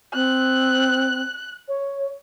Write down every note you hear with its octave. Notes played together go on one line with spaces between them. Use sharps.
C4 F#6
C#5